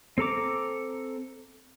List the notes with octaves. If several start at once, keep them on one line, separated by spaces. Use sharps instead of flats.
C4 A4 A#5 D6